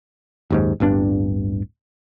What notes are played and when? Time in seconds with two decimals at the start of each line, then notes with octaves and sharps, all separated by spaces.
0.50 F#1 D#2 G#2
0.80 D1 G1 G2 D4